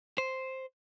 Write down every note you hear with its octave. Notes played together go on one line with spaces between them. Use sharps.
C5